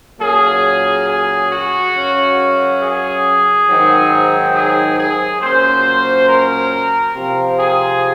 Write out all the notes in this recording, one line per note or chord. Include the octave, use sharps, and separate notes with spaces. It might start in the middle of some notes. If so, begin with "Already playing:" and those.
A#2 F#3 A#3 C#4 G#4
G#4
F#4
F#2 C#3 F#3 C#4
G#4
G#2 D#3 F#3 C4
G#4
G#4
A#2 F#3 A#3 C#4 C5
A#4
C3 F3 C4
G#4